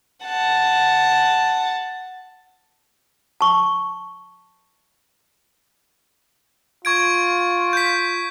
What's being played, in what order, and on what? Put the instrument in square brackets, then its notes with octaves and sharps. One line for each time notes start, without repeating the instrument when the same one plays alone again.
[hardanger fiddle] F#5 A5
[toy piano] A5 C#6
[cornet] F4 [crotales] C#6 G#6 D7
[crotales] G6 B6